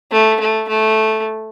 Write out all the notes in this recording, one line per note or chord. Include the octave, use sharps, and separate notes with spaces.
A3
A3
A3